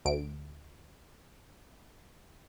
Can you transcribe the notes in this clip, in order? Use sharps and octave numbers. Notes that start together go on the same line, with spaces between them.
D2 D7